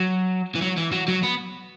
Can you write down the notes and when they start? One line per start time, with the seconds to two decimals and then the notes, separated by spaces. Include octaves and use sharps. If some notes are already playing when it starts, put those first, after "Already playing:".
Already playing: F#3
0.55 E3
0.62 F#3
0.77 E3
0.92 F#3
1.08 F#3
1.23 B3